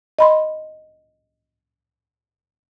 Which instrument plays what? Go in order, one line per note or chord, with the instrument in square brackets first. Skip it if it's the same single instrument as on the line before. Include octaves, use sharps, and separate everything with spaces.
[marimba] D#5 B5 C6